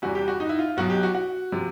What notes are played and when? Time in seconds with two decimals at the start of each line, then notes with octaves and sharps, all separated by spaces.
0.02 E2 C3 E3 G3 F#4
0.15 G4
0.28 F#4
0.40 D#4
0.49 E4
0.59 F4
0.77 B1 B2 F#3 F#4
0.90 G4
1.03 F#4
1.14 F#4
1.52 C3 F3